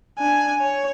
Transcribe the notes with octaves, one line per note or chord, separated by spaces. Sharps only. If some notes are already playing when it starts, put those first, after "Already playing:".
D4 G#5
C#5